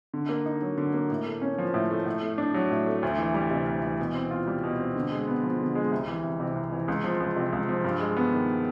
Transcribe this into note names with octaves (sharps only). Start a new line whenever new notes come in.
D3
A#3
D#4
F#3
D3
A#3
A2
A3
C#4
F3
A2
A3
A2
A3
D4
F#3
A2
A3
D2
E3
G3
C3
D2
E3
B2
C4
F4
G3
B2
C4
D3
G#3
B3
F3
D3
G#3
C2
E3
C2
C3
C2
E3
C#2
F3
C#2
C3
C#2
F3
G2
G#3
B3
D#3